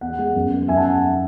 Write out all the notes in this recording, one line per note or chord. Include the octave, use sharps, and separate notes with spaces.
E2 F#5
G#3
F#2
B3
F#2 E5 G#5
F#5 A5